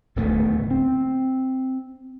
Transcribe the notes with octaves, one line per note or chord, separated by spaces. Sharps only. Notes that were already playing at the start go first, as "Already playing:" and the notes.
D1 D#2 B2 A3
C4